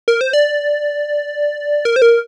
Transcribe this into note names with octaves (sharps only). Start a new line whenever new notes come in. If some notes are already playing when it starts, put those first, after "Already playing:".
A#4
C5
D5
A#4
C5
A#4